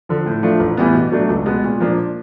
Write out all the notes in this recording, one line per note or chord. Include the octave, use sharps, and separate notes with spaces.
D3 F3
A2
F3 A3 D4 F4
A1
A2 E3 G3 B3
B2
F#3 A3 D4
C#2
B2 G#3 B3
A#2
F3 A#3 D4